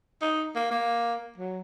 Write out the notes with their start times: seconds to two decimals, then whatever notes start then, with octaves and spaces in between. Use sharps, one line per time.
0.22 D#4
0.56 A#3
0.71 A#3
1.38 F#3